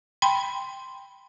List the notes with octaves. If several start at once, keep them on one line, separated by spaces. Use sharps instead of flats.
G5 B5 C6